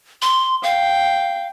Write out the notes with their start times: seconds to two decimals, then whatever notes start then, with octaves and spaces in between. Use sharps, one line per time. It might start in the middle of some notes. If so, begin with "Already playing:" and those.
0.22 C6
0.63 F5 G5